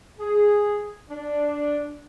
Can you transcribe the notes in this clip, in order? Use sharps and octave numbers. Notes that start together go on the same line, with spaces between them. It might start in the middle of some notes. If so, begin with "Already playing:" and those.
G#4
D4